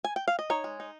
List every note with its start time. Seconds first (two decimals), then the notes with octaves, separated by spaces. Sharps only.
0.05 G#5
0.16 G5
0.28 F5
0.39 D#5
0.50 D#4 C#5
0.64 G#3
0.80 D#4